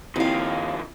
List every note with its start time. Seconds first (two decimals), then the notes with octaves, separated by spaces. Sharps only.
0.16 D#2 D#3 F3 C4 E4 F5